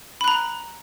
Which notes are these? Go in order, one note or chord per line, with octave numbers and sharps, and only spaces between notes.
A#5 B5 F#6